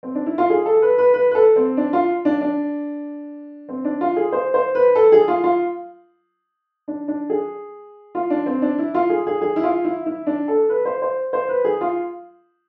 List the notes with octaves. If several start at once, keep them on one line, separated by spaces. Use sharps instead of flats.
C4
D4
E4
F4
G#4
A4
B4
B4
B4
B4
A4
C4
D4
F4
D4
D4
C4
D4
F4
G#4
C5
C5
B4
A4
G#4
F4
F4
D4
D4
G#4
F4
D4
C4
D4
E4
F4
G#4
G#4
G#4
E4
F4
E4
E4
D4
A4
B4
C5
C5
C5
B4
G#4
F4